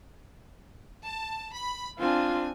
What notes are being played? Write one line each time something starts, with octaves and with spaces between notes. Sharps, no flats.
A5
B5
C4 D4 F4 G#5